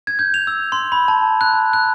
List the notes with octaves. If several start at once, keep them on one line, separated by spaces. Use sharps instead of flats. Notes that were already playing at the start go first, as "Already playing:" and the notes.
G#6
G6
F7
E6
C6
B5
A5
F#6
F#6